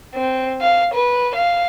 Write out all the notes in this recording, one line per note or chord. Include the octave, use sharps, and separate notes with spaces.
C4
F5
B4
F5